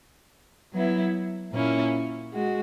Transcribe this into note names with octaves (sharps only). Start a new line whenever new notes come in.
F#3 B3 E4
A#2 A#3 C#4 E4
G#3 F#4